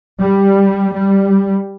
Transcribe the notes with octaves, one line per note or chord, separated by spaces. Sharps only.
G3
G3